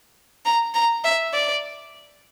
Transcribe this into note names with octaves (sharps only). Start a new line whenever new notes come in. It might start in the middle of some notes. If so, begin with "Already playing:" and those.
A#5
A#5
E5
D5